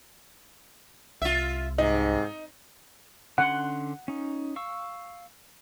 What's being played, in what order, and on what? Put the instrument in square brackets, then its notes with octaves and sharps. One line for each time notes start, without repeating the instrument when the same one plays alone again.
[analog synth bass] C2 [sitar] F4 E5
[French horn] G#2 [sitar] C3 [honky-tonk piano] D#4
[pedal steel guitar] D3 C#4 C6 [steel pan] F#5
[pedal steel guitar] C#4 D#4
F5 C#6 E6